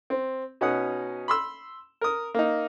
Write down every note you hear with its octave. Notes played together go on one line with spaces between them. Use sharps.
C4
B2 C#4 D#4 F#5 D#6
B5 C6 E6
A#4 D#6
A#3 D#4